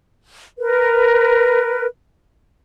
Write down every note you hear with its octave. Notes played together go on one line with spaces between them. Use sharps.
A#4 B4